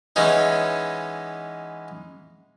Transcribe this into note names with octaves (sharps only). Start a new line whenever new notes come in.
E3 G#3 B3 C#4 D#4